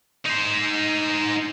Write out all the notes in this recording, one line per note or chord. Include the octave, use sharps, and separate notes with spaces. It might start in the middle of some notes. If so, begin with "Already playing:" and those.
D#4 C5